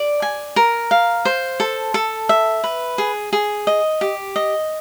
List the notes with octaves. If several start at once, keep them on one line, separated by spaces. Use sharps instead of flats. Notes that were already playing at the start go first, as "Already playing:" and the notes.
Already playing: D5
G#5
A#4
F5
C5
A4
A4
E5
B4
G#4
G#4
D#5
G4
D#5